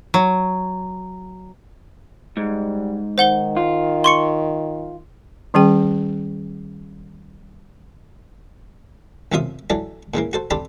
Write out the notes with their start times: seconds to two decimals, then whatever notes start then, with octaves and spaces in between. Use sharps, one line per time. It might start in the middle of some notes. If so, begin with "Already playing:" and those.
0.14 F#3
2.37 G#2 G3
3.18 D#3 C5 F#5 G7
3.57 F4
4.04 C6 C#6 C#7
5.54 D#3 G3 C#4 G#4 G5
9.32 B1 F#2 C3 F4 E5 D#6
9.70 E3 F#3 D4 A4
10.14 A#2 C#3 E3 A#3
10.33 F#4 A4 C5
10.51 C4 D4 G4 A4 C5 B5